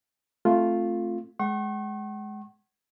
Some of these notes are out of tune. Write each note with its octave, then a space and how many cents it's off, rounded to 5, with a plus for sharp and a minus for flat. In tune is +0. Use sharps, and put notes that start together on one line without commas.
A3 -5 C4 +10 F4 +0
G#3 +20 F#5 +40 C#6 -40